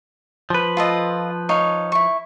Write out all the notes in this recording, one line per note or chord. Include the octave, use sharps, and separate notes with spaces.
F3 B4
F4 A4 D#5
D#4 C#5 F5
E4 C#6